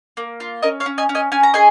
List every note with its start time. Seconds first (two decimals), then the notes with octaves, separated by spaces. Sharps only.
0.17 A#3
0.40 F4
0.63 C#4 A#4 D#5
0.80 C#5 F5
0.86 C#4
0.98 D#5 G#5
1.09 C#4
1.15 D#5 G#5
1.32 C#4 G#5
1.43 A#5
1.54 G#4 D#5 G#5